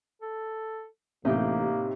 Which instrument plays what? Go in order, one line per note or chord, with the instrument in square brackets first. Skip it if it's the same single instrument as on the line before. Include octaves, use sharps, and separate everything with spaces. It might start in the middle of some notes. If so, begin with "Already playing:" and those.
[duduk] A4
[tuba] A1 [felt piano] A2 C3 [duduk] A#3 [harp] D#4 G4